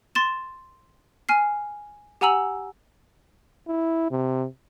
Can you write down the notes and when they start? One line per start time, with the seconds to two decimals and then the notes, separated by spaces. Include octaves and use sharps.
0.15 C6 A6 E7
1.29 G#5 F6 C7
2.21 G4 F#5 G#5 A#5 E6 F#7
3.68 E4
4.11 C3